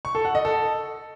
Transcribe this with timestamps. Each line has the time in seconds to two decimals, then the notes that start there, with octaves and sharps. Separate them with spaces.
0.05 C#6
0.15 A4
0.25 F#5
0.35 D#5
0.45 A4